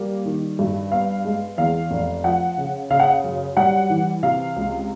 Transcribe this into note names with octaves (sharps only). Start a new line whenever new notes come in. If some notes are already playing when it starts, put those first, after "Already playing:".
Already playing: G3 A#3
D#3
G2
B3 F5
G#3
E2 F5
F1
F3 F#5
C#3
C#3 F5
F#5
F5
F#2
G3 F#5
E3
C3 F5
C#2